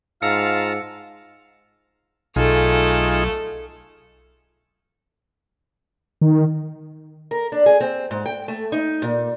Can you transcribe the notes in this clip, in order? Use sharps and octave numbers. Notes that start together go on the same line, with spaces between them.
G#2 F4 F5 A5 A#5 E6 C#7
B1 A3 D#4 F4 G#4 A4
D#3
A#4
D4
G#4
C4
G#2
G5
A3
D#4
A#2